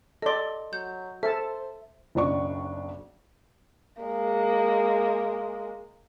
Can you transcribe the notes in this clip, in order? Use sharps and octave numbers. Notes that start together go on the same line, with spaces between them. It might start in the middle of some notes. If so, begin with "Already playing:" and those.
A4 D5 D#5 C6
F#3 G6
A4 C5 E5 A5
F#1 B1 D4 C#6
G#3 A#3